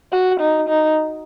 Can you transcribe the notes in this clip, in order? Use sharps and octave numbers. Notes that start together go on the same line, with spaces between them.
F#4
D#4
D#4